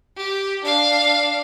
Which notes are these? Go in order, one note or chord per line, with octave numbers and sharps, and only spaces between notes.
G4
D4 F5